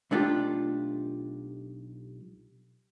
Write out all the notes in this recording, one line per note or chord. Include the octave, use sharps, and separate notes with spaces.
B1 A3 D4 F4 G4